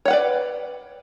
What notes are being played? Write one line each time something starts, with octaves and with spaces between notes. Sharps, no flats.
B4 C#5 D5 F#5